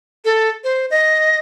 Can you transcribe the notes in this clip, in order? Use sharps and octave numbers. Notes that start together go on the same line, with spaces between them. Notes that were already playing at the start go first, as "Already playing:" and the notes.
A4
C5
D#5